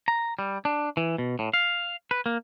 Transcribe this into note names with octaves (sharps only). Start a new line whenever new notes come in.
A#5
G3
D4
E3
B2
A2
F5
B4
A#3